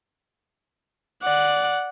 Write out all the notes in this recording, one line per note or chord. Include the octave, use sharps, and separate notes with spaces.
D5 F#5